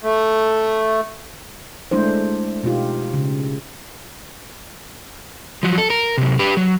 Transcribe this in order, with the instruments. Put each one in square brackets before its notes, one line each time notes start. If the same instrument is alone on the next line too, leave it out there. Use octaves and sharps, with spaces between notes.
[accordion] A3
[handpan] G#3 A3 D4 E4 C5
B2 D#4 F4 G4
C#3
[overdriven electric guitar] F3 F#3
A4
A#4
C3 F#3
G4 B4
F#3